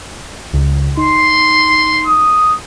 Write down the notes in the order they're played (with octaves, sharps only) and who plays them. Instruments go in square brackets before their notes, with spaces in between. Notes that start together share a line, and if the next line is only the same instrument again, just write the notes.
[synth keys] C#2 C#3
[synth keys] D#4 [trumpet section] C6
[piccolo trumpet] D#6